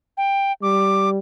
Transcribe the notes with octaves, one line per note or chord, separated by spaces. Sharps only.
G5
G3 D6